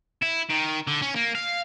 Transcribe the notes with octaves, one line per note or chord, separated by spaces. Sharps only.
E4
D#3
D3
C#4
A#3
F5